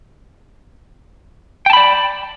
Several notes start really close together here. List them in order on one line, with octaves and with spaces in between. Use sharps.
G5 A5 B5 D5